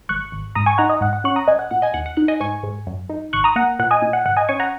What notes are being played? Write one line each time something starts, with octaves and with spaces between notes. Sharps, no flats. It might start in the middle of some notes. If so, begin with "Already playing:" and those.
G#1 C#6 F#6
G#1
G#2 A#5 D#6
G#5 C#6
D#4 F#5 A#5
D#5
G#2 F#5
F#5
C#4 C#6 F#6
A#5 D#6
A#1 D#5 G#5
F#5
A#1 F#5
D#5 G#5
D#2 F#5
F#5
D#4 F#5
D#5 G#5
G#2 G#5 C#6
G#2
F#2
D#4
G#1 C#6 F#6
A#5 D#6
A#3 F#5 A#5
A#2 F#5
D#5 G#5
A#2
F#5
G#1 F#5
D#5 G#5
C#4 G#5 C#6
F#5 A#5